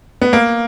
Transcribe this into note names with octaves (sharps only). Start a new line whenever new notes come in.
B3
A#3